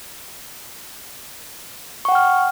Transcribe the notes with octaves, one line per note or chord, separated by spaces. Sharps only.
F#5 G5 C#6 F6